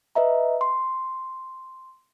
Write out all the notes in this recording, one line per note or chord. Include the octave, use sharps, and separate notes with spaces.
B4 D#5 E5 A#5
C6